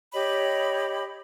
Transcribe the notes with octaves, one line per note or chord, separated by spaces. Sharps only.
G4 C#5 D#5 B5